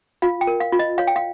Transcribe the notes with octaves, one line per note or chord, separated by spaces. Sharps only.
F4 F5
G5
A#4
F5
F4
D#5
C#5 F5
G5
F5